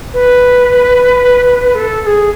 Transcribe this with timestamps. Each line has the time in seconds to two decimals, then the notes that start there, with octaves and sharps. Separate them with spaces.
0.14 B4
1.75 A4
2.02 A4
2.06 G#4